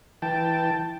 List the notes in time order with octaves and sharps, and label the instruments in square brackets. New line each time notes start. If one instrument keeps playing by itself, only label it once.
[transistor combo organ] E3 G5 A5